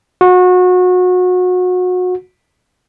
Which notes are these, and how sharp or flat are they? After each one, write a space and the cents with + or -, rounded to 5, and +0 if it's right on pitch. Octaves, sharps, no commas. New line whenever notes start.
F#4 -30